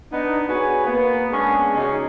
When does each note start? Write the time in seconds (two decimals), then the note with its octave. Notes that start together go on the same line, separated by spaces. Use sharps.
0.12 B3 D4 D#4
0.49 F#4 G#4 B4 C#5 G#5
0.85 A#3 B3
1.32 G#3 B3 C#4 D4 G#4
1.75 C#3 C#4 D#4 F#4 G#4